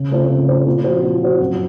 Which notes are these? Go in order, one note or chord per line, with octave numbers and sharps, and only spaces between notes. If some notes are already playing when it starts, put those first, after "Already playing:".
Already playing: C#3
A3 C4 F4 C5
C#3
A3 C4 F4 C5
A#2
F3 C4 F#4 C5
A#2
F3 C4 F#4 C5
F#2